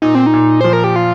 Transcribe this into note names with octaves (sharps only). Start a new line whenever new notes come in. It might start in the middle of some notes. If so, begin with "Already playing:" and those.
A#2 D#4
C4
D#4
A#2
F3 C5
A#4
G4
F4